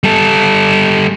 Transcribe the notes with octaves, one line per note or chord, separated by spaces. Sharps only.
G3 A4